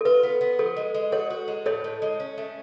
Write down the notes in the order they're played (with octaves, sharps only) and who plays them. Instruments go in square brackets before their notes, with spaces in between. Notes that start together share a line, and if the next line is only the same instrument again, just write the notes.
[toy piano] A4
[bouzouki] F4 [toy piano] B4
[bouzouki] B3
B3
[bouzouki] F3 [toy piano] A4
[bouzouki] G#3
G#3
[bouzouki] F#4 [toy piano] A4 C#5
[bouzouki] F#4
G#3
[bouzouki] A2 [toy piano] A4 C#5
[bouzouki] A2
G#3
C#4
A3